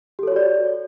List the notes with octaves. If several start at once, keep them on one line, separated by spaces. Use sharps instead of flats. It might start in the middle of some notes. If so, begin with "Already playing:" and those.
F#4 G4 A4 C#5 D5